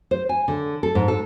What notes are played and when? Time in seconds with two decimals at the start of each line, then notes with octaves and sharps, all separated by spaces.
0.11 C5
0.29 G#5
0.48 D3
0.83 A4
0.95 G#2
1.08 A4